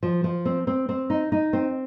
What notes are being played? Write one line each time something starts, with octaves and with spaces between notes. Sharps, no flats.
F3
F3
C4
C4
C4
D#4
D#4
C4